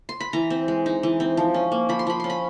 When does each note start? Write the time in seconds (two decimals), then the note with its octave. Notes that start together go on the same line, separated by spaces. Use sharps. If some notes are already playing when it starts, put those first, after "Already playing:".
0.09 C6
0.20 B5
0.33 E3 A#5
0.50 C4
0.68 G#3
0.86 D#4
1.03 E3
1.20 C4
1.37 F3
1.54 C#4
1.72 A#3
1.89 F3 B5
1.99 C6
2.07 F3 B5
2.20 C#4 C6
2.30 B5